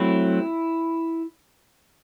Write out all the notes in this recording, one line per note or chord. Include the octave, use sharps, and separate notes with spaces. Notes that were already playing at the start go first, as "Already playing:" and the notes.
Already playing: F#3 A3 C4 E4